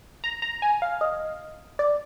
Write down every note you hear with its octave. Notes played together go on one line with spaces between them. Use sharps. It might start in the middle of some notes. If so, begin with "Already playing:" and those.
A#5
A#5
G#5
F5
D#5
D5